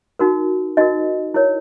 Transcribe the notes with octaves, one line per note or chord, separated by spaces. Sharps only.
D#4 F#4 A#4
D#4 F#4 A#4 D#5
E4 A#4 C#5